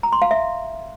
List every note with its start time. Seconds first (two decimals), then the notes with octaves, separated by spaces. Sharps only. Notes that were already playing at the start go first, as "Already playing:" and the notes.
0.03 A#5
0.12 C6
0.22 F5
0.31 E5